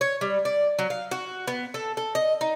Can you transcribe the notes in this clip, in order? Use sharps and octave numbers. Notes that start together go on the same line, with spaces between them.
C#5
G3
D5
F#3
F5
F#4
B3
A4
A4
D#5
D#4